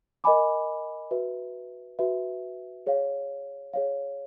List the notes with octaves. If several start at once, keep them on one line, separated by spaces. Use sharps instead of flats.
A#4 D#5 G#5 B5 D6
F#4 B4 E5
F#4 B4 E5
G#4 C#5 F5
G#4 C#5 F5